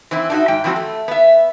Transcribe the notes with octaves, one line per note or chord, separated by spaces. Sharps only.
E3 C4 E4
D4 D#4 F#4 E5
G#2 G#3 G5
E3 F3 C4 E4 F#4
A3
B3 E5